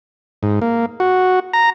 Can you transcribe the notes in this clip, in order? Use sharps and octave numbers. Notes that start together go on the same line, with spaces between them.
G#2
A#3
F#4
A#5